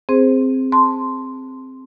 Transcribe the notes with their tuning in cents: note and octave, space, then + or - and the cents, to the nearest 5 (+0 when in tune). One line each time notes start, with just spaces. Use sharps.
C4 +0 G#4 -10 C5 +0
A5 +0 C6 -5